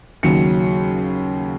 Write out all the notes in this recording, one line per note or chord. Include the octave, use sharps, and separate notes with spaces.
D#2 C#3 F#3 C#7